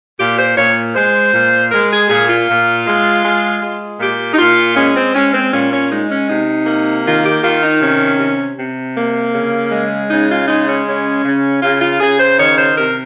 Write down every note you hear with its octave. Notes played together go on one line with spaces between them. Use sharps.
A#2 G4
C5
A#2 C#5
G#3 C5
A#2
G#3 A#4
G#4
A#2 G#4
F4
A#2
G#3
G#3
G#3
A#2 G4
D#4
A#2 F4
G#3 C#4
C4
G#3 C#4
C4
A#2 C#4
C#4
G#3 D#4
C#4
C3 D#4
A#3
D#3 F4
G4
D#3 F4
D#4
C3 C#4
C3
C3
A#3
C#3
G#3
C#3 D#4
F4
G#3 D#4
C#4
C#3 C#4
C#3
C#3 F4
F4
C#3 G#4
C5
D#3 C#5
C5
C3 A#4